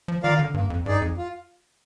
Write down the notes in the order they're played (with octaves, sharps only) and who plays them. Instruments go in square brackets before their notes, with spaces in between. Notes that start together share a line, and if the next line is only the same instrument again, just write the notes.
[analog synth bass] F3
[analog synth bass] D#3 [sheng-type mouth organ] F4 A#4 D5 F5
[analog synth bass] D3
[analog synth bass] G2 [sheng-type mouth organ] A#3
[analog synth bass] F2
[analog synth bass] G2 [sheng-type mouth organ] D#4 G#4 D5
[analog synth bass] F2
[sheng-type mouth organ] F4